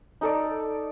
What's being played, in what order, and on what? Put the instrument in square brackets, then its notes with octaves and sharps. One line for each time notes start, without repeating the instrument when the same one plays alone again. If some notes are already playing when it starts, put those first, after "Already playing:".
[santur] D#4 A4 D5